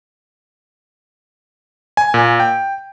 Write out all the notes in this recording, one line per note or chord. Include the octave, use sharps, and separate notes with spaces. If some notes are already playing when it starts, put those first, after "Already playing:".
G#5
A#2
G5